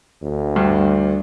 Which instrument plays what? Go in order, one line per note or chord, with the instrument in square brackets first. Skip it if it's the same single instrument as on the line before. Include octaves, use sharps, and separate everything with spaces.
[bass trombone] D2
[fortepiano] G2